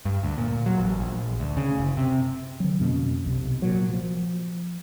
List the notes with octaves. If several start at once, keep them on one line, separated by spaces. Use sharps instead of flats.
G2
D2
A#2
F#3
A1
A#1
D2
C#3
F#1
C3
D3 F#3
F2 B2 A#3 C#4
B1 C3
A#2 F#3
F3